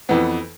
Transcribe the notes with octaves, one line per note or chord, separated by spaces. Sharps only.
F2 E3 B3